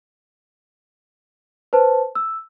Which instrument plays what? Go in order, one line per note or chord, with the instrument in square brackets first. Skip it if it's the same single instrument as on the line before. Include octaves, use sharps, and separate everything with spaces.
[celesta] B4 C5 A5
E6